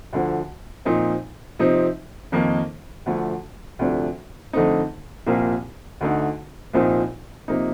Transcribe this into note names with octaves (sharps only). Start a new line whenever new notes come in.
D2 D3 F3
A#2 F3 C4 D#4
C3 F3 C4 D#4
F2 D#3 A#3 D#4
D2 D3 F3 A3
D2 C3 F3 A3 D4
F2 D3 A3 C4 D#4
C2 A#2 F3 A#3
D2 D3 A3 D#4
C2 A#2 F3 C4 D#4
C3 F3 A#3 D#4